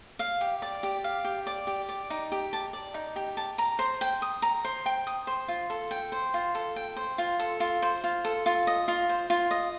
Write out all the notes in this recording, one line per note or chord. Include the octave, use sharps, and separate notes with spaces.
F5
G4
D5
G4
F5
G4
D5
G4
D5
D#4
G4
A5
D5
D#4
G4
A5
A#5
C5
G5
D#6
A#5
C5
G5
D#6
C5
F4
A4
G5
C5
F4
A4
G5
C5
F4
A4
F4
C5
F4
A4
F4
D#5
F4
C5
F4
D#5